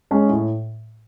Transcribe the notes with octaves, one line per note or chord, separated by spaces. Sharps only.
G#3 C#4 G#4
A2